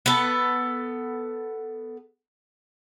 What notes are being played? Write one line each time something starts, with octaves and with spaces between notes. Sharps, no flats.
B3 A4